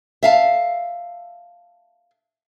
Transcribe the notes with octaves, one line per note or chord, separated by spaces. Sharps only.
E5 F5 A5